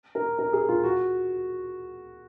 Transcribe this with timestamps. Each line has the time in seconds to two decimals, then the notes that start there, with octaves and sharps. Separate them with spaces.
0.15 A#4
0.38 A#4
0.53 G#4
0.69 F4
0.83 F#4